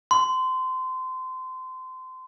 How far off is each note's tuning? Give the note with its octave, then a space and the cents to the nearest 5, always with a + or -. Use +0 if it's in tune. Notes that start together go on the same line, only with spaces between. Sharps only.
C6 -25